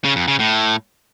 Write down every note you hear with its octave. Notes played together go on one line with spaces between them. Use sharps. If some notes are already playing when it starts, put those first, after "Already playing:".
C#3
F2
C#3
A2